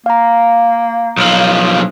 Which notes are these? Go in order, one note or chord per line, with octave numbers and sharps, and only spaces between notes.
A#3 F5 A#5
B1 F3